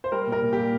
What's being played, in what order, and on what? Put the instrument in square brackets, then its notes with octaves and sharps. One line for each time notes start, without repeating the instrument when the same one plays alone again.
[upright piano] C5
G3 A#4
A#2
A#4
A#2
A#2 G4